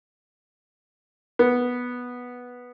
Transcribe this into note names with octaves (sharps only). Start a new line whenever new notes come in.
B3